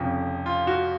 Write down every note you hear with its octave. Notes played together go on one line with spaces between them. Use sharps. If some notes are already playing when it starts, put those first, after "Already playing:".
Already playing: F1 F2 C#3
F4
F#4